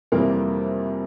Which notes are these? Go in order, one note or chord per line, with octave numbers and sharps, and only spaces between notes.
F2 C3 E3 G3 A#3 A#4